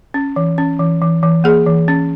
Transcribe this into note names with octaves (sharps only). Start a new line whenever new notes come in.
C#4
E3
C#4
E3
E3
E3
A#3 G#4
E3
C#4